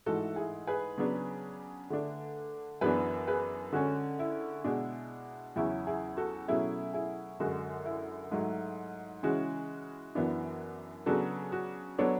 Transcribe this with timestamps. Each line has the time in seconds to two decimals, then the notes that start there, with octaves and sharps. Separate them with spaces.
0.06 G#2 E3 A3 F#4 A4
0.36 E4 G#4
0.67 G#4 B4
0.98 C#3 F#3 B3 D4
1.90 D3 A3 D4
2.81 F#2 E3 B3 D4 G#4 B4
3.27 G#4 B4
3.72 D3 G#3 C#4 F#4
4.19 E4
4.64 B2 G#3 D4
5.56 E2 C#3 F#3 C#4 E4
5.87 E4 G#4
6.17 F#4 A4
6.48 B2 F#3 A3 C#4 E4 G#4
6.93 E4 G#4
7.40 F#2 D3 G#3 F#4
7.85 E4
8.31 G#2 F#3 A3
9.23 C#3 E3 G#3 C#4 F#4
10.15 F#2 E3 B3 D4
11.06 C#3 F#3 B3 D4 F#4 A4
11.52 F#4
11.99 F#3 B3 D4 A4 C#5